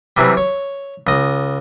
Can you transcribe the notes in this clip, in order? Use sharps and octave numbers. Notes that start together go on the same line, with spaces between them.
C3 E3 F#3 G3
C#5
C#2 D#5